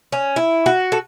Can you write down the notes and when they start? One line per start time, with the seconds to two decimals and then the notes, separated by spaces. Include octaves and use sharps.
0.12 C#4
0.36 E4
0.66 F#4
0.92 A4